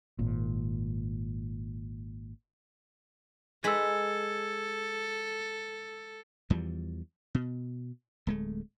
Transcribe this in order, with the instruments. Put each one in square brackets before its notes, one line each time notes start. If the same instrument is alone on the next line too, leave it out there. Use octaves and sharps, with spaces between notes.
[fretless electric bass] G#1 A#2
[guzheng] G#3 B4 B5 [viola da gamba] A4 [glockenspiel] E6 G#6
[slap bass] E2 E3 F3 G3
B2
D1 G#3 A3